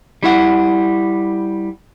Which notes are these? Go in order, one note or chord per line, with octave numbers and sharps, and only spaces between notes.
G3 E4 F#5